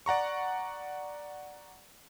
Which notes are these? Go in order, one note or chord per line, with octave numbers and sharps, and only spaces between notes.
D5 F#5 A#5 C#6